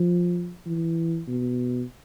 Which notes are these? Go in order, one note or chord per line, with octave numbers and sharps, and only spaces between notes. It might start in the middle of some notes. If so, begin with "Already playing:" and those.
Already playing: F3
E3
B2